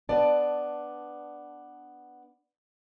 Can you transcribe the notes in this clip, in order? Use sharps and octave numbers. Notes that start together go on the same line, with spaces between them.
B3 D4 D5 A5